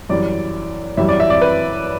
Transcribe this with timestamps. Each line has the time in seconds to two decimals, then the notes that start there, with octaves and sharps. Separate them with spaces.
0.09 F#2 E3 G3 D5
0.97 F#2 E3 G3 E5
1.08 D5
1.20 E5
1.30 D5
1.42 B4